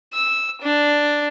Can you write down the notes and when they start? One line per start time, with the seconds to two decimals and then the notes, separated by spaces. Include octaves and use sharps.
0.13 E6
0.61 D4